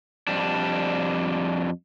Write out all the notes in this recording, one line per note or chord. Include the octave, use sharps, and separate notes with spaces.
F2 G3 D4